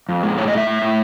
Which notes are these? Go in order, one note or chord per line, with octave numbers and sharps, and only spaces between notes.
F2
G#3
A2 C#5
D#5
A2 E5
A2
A2